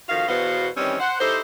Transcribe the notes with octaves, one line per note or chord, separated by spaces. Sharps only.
F2 D#3 F#4 F5
E2 B2 B3 F#4 C5 F5
D#3 E3 G3 C4 C#4
C5 F#5
D#4 E4 G4 A4 C5